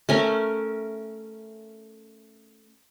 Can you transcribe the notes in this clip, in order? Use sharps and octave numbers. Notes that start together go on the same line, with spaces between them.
A3 C#4 A#4